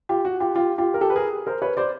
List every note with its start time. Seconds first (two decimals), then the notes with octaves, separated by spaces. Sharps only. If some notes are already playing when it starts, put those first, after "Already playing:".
0.09 F4 G4
0.25 F#4
0.40 F4 G4
0.55 F4 G4
0.78 F4 G4
0.94 A#4
1.01 G4 A4
1.10 B4
1.16 G#4 A#4
1.47 A#4 C5
1.62 B4 C#5
1.77 C5 D5